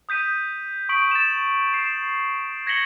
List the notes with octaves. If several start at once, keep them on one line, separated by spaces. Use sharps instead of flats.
D#6 G6 B6 D#7
C#6 D#6 B6 D7 F#7
A6 E7
C7 E7
G#6 A#6 B6 C#7 F#7 G7